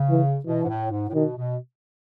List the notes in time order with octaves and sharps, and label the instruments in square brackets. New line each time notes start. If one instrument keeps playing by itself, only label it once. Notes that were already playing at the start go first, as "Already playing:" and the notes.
Already playing: [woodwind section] C#3
[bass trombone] E3
[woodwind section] B2 [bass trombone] E3
[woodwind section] G#2
A2
G#2
A2
[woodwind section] B2 [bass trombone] D#3
[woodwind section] B2